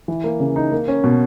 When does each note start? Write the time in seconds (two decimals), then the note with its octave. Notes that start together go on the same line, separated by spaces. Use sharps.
0.08 E3
0.24 A#3
0.40 C#3
0.56 D#4
0.72 A#3
0.88 C#4
1.04 B2